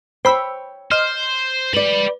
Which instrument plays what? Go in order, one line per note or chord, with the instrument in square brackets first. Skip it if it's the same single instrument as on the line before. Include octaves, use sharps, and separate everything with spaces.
[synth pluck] C5 B5 E6 [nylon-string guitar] C#5 G5
[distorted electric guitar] C5 [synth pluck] D#5 F6
[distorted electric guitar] G4 B5 [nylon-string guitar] B4 D5